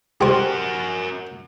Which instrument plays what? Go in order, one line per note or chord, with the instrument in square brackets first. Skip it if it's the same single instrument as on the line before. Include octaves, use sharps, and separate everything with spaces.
[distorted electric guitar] F#4 A#4 [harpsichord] G4 C5